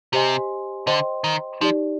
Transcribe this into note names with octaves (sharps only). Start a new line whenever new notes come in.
C3 G4 C5 D#5 G#5 C6
D3 C5 D#5 G5 C6
D#3
F3 D#4 G4 D5